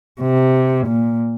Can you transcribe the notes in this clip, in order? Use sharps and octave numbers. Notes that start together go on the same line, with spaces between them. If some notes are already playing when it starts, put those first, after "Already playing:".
C3
A#2